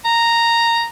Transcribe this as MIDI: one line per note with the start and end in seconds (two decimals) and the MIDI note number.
0.05 0.84 82